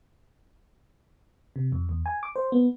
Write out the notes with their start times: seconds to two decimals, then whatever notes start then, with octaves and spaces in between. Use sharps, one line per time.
1.56 C3
1.72 F2
1.89 E2
2.06 G#5
2.23 D6
2.36 C5
2.52 B3